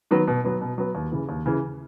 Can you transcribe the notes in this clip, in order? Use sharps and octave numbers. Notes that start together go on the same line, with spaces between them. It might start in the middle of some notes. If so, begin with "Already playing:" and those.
D#3 F#3 B3
B2
F#3 B3
B2
F#3 B3
D#2
C#3 E3
D#2
C#3 E3